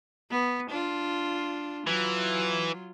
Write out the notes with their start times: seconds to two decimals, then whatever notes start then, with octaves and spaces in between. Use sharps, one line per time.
0.31 B3
0.71 D4 F4
1.87 E3 F#3 F4